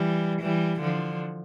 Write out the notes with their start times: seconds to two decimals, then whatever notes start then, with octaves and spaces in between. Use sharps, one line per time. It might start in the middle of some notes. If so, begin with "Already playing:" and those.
Already playing: E3 G3
0.41 E3 G3
0.81 D3 F3